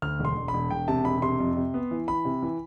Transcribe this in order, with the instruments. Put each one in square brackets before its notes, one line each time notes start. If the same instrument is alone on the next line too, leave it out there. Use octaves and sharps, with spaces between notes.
[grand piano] D2 F6
E1
C6
E1
B5
E1
E1 G5
C3 A5
E1 B5
C3 C6
F2
C3
B3
E3
E3 B5
C3
E3